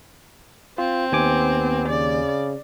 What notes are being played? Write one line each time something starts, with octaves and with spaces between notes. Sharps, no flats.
C4 F4
D#2 B3 G#5 D6
C#3 D5